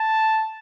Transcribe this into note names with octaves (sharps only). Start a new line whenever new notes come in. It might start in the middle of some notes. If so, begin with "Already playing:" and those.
Already playing: A5